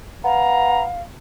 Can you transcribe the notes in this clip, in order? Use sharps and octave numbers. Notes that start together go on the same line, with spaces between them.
B3 F5 A#5